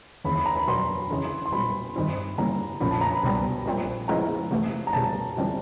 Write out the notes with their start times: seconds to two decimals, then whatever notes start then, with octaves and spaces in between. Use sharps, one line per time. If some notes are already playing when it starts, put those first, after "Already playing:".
0.25 D#2 C#3 E3 B5
0.36 B5
0.46 A#5
0.56 B5
0.67 B2 F#3 A#3 D4 C6
1.10 C#3 E3 G#3 C#4
1.46 C6
1.52 B1 A#2 G3 C4 B5
1.96 G2 D#3 G3 C4 D#4
2.38 C#3 E3 G3 A#3 A#5
2.80 B1 A#2 F3 A3 C#4 B5
2.91 A5
3.01 A#5
3.12 B5
3.24 C2 B2 G3 B3
3.65 A#1 A#2 G3 C4
4.08 C#3 F3 G#3 B3 E4 A#5
4.51 C3 E3 A3
4.87 A#5
4.93 C#2 B2 G3 A5
5.36 F2 C#3 E3 G3 C4